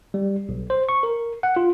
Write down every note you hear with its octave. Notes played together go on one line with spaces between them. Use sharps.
G3
B1
C5
C#6
A#4
F#5
F4